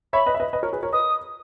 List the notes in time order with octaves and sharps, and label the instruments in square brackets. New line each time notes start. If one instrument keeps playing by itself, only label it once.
[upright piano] C#5 E5 [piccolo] B5
[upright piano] B4 D#5
E5
B4 D#5
B4 D#5
A#4 C#5
G#4 B4
A#4 C#5
[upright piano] B4 D#5 [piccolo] D#6